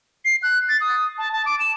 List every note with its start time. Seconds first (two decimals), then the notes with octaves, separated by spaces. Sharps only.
0.25 C7
0.43 F#6
0.69 A6
0.81 D#6
1.18 A5
1.32 A5
1.46 D6
1.59 E7